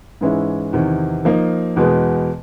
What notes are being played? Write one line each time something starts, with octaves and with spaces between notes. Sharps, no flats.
G#2 E3 G#3 C#4 E4
E2 C3 D#3
F3 A#3 D#4
E2 B2 G#3 B3